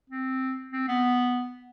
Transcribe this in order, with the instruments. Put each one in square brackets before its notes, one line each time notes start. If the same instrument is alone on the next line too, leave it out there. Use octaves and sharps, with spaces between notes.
[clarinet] C4
C4
B3